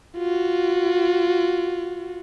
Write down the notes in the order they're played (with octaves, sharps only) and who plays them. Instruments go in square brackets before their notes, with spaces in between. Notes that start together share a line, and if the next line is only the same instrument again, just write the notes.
[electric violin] F4 F#4